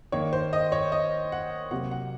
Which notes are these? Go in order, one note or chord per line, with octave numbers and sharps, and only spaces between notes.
D#3 A#3 C#5
C5
D#5
C#5
D#5
F#5
C3 F#3 A#3 F#5
F#5